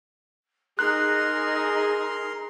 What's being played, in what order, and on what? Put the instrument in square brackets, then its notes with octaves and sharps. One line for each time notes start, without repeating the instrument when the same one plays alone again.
[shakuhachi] D#4 [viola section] G#4 [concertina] A#4 C6 [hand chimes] F#6